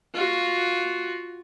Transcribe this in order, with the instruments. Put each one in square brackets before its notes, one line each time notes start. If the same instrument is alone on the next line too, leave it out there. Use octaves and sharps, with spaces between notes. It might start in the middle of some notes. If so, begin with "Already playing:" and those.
[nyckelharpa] F4 F#4